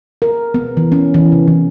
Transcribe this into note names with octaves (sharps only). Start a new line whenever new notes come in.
A#4
B3
E3
C#4
E3
C3
E3